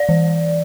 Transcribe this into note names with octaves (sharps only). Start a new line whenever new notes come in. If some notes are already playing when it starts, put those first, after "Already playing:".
Already playing: D5
E3